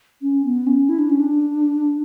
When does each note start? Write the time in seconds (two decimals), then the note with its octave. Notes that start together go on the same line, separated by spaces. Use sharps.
0.22 C#4
0.45 B3
0.66 C#4
0.89 E4
0.99 D4
1.10 C#4
1.20 D4